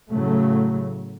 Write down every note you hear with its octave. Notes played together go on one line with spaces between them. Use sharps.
A2 C#3 F#3 A3